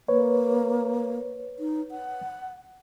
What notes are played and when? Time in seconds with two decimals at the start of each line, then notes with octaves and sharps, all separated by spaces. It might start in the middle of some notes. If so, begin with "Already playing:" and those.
0.08 A#3 B4 C#5
1.59 D#4
1.91 F#5